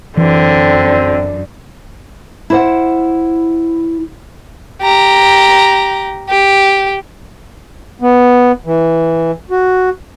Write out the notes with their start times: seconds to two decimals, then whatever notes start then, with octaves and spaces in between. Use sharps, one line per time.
0.17 F#2 D3 E3 C4
2.50 E4 C5 F#5
4.82 G4 A#5
6.30 G4
8.02 B3
8.66 E3
9.51 F#4